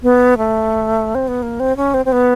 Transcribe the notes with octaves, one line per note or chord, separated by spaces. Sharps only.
B3
A3
C4
B3
A#3
C4
C#4
C4
C4
B3